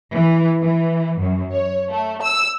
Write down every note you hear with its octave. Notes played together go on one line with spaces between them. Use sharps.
E3
E3
F#2
C#5
A3
E6